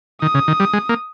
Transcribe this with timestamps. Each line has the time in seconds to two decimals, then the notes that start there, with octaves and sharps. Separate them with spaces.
0.22 D#3 D#6
0.35 C#3
0.48 D#3
0.60 G3
0.73 G#3
0.89 A#3